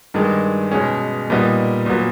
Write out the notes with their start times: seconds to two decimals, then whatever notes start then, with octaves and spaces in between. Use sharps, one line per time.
0.14 G2 D#3 G#3
0.72 B2 G#3 C#4
1.30 A#2 G3 B3 D#4
1.86 A#2 F#3 B3